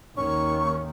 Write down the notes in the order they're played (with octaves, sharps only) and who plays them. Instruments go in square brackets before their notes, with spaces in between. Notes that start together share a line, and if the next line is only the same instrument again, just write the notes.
[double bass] D#2 D#3 [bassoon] C#4 [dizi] C#6